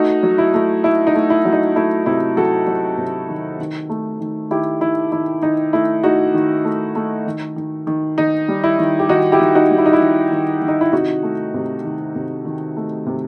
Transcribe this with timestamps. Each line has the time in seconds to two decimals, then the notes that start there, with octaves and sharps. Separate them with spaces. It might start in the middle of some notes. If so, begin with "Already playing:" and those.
Already playing: A3 D#4 F#4
0.23 F#3
0.38 E4
0.54 A3
0.84 A3 E4
1.07 D#4
1.15 A3
1.30 E4
1.45 F#3
1.53 D#4
1.76 A3 E4
2.06 C3 E4
2.37 F#3 F#4 A4
2.67 F#3
2.98 C3
3.29 D#3
3.59 D#3
3.90 A3
4.20 D#3
4.50 D#3 E4 G4
4.81 D#3 E4
5.12 D#3 E4
5.42 D#3 D#4
5.73 A3 E4
6.03 A3 D#4 F#4
6.34 D#3
6.65 A3
6.95 A3
7.26 D#3
7.56 D#3
7.87 D#3
8.18 D#3 D#4
8.48 G3
8.64 E4
8.79 D#3
8.99 G4
9.09 D#3 D#4 F#4
9.32 E4 G4
9.40 D#3
9.55 D#4 F#4
9.71 G3
9.78 E4
9.86 D#4
9.93 E4
10.01 D#3
10.32 D#3
10.62 D#3
10.68 D#4
10.81 E4
10.92 C3 D#4 F#4
11.23 A3
11.54 C3
11.84 D#3
12.15 C3
12.46 D#3
12.76 A3
13.06 C3